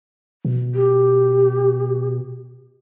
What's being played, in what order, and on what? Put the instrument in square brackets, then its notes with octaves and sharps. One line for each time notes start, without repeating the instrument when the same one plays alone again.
[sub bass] B2
[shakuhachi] G4